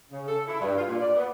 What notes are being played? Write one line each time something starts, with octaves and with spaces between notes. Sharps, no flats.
C#3
A4
E4
G2
F4
A#2
D5
B3